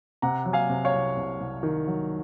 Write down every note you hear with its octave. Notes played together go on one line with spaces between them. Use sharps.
C3 F#5 A#5
F#3
F5 G#5
C3
C#5 F5
C2
C2
C2
D#3
F#3